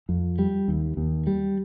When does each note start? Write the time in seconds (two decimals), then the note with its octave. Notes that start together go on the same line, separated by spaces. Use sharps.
0.09 F2
0.39 G3
0.68 D#2
0.97 D#2
1.27 G3